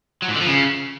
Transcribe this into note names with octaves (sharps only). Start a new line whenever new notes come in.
F#3
G#2
D3
F3
C#3